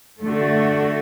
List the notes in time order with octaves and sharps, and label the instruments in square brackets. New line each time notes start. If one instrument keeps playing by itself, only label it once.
[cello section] D3 A3 D4 F#4